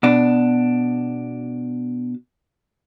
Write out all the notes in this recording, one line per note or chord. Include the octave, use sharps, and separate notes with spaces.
B2 D4